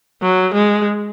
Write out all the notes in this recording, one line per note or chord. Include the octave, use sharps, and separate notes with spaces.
F#3
G#3